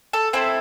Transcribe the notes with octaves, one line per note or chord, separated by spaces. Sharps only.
A4
C4 E4 A4 C5